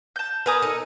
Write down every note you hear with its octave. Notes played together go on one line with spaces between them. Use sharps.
A5 G6
A#4 B4 G#5 A#5 D#6
D#4 A4